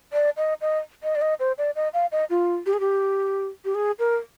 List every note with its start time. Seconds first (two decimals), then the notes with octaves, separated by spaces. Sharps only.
0.13 D5
0.37 D#5
0.61 D#5
1.03 D#5
1.16 D5
1.22 D#5
1.40 C5
1.58 D5
1.76 D#5
1.94 F5
2.12 D#5
2.30 F4
2.66 G4
2.73 G#4
2.80 G4
3.65 G4
3.75 G#4
3.99 A#4